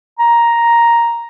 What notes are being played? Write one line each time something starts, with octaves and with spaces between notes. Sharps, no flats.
A#5